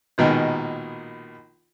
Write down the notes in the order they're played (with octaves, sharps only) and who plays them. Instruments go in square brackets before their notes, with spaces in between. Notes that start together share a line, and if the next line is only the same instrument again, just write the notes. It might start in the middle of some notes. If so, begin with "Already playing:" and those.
[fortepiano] A#1 B2 D#3 G#3